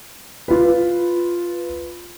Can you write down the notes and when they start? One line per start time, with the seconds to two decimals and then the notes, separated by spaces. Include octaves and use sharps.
0.48 F4 B4